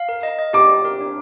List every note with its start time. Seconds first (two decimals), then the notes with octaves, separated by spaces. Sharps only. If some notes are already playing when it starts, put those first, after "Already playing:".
Already playing: F5
0.09 A#4
0.23 D#5
0.39 D#5
0.53 G4 D6
0.69 G4
0.85 A#4
1.01 D4